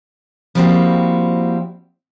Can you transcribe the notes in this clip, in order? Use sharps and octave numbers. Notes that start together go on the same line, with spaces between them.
F3 G3 A#3 C4 E4 F#4